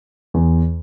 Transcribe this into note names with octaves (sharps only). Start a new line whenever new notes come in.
E2